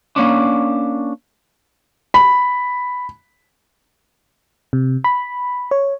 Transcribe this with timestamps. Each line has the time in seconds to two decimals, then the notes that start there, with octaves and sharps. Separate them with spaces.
0.16 A#3 C#4 D4
2.14 B5
4.73 C3
5.04 B5
5.71 C#5